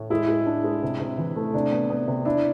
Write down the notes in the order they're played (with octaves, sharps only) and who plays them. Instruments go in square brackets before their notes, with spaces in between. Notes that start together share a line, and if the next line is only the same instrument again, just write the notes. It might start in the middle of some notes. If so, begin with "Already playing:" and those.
Already playing: [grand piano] A2
[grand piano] G#3 [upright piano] E4
[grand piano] G#3
D4
G#3
C3
C3
E3
A3
[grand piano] C3 [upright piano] D4
[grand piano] B3
B3
C3
[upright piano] D4 [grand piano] E4